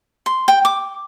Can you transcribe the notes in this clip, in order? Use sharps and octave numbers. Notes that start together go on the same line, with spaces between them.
C6
G5
D6